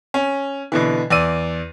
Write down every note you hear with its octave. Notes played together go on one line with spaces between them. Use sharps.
C#4
B2 D3 E3
E2 D5 E6 D#7